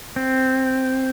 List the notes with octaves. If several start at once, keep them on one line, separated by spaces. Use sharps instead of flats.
C4